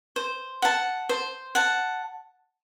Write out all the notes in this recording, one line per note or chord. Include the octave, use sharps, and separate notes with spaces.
C5
F#5 A5
C5
F#5 A5